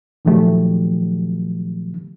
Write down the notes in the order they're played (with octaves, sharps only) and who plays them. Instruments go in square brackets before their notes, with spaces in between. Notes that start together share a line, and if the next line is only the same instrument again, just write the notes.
[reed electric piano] A#2 D#3 F3 F#3 A3 G4